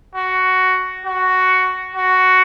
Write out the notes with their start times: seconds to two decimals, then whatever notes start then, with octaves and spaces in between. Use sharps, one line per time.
0.15 F#4
1.06 F#4
1.96 F#4